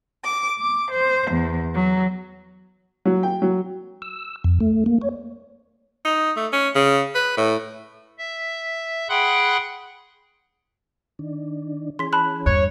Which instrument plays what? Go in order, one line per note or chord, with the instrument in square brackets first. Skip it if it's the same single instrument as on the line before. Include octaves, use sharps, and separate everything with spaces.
[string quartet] D6
D6
C5
E2
F#3
[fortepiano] F#3
G5
F#3
[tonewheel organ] E6
F2
A3
A#3
C#5
[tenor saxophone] D#4
A3
C#4
C#3
B4
A2
[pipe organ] E5
G#4 F#5 G5 B5 C6 F#6
[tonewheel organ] D#3 D4
[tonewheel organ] E3 C#4 G#4 [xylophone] C6 B6
[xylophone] A5 B5 F#6
[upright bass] E2 G2 [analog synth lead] C#5 [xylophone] F#6